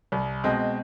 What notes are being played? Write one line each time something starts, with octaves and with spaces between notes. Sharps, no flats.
C2
B2 G#3 C4